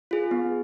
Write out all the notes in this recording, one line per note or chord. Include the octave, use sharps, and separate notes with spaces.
F4 G#4
B3